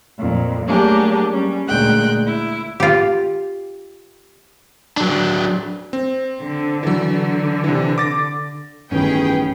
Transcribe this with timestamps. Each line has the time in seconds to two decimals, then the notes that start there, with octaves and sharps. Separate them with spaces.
0.18 F2 A#2
0.66 F#3 A3 A#3 D4 G4 G#4
1.32 G3 C#4
1.67 D2 A#2 G#3 G5 F#6
2.27 E4
2.80 F4 G4
4.97 F#3 D4
5.93 C4
6.43 D3
6.83 E3 F#3
7.14 D3
7.64 C3 E3
7.98 D6 A6 A#6
8.91 A1 G2 D#3 B3 C#4 G#4 B4 G5